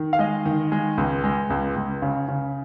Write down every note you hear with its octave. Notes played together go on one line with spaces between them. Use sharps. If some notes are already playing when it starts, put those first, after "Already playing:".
Already playing: D#3
F5
G#3 D#5
D#3
G#3
C#2
G#3
C#2
C#2
C#3
C#3